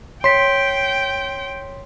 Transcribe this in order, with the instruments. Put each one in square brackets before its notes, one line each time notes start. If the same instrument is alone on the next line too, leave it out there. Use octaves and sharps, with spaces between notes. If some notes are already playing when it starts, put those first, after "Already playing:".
[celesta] C#5 B6 [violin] G5 [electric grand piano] C6